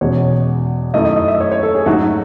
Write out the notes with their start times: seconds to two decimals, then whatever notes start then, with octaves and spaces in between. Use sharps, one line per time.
0.01 E2 B2 G#3 C#4 C#5
0.94 F#2 D#3 A3 E4 D#5
1.05 D#5
1.16 D#5
1.28 E5
1.40 C#5
1.51 C#5
1.63 A4
1.75 G#4
1.86 G#2 F#3 A3 D#4 F#4